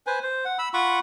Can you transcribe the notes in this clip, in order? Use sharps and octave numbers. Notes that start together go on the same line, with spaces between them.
B4 C5 G#5
C5
F#5
B5 E6
F4 F#5 B5 C#6